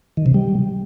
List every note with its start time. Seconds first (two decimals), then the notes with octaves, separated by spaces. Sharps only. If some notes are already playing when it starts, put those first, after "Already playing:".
0.17 D#3
0.26 C3
0.34 G3